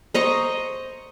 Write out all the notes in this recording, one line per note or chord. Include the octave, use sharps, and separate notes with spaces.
C5 D#5 A#5 C#6